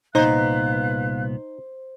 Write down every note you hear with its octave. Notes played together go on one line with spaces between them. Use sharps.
C2 A#2 B3 D#4 B4 C5 F5 F#6